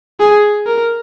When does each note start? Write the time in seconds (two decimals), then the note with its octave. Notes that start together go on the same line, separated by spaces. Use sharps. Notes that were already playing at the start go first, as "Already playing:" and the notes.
0.20 G#4
0.67 A#4